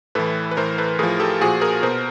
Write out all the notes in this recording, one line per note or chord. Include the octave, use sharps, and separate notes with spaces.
A2 E3 A4 B4
B4
A2 E3 A#4 C5
A4 B4
A2 F3 G#4 A#4
G4 A4
A#2 F3 F#4 G#4
G#4 A#4
B2 A#4 C5